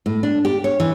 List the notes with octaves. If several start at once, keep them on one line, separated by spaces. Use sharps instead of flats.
A2
D4
G4
C#5
E3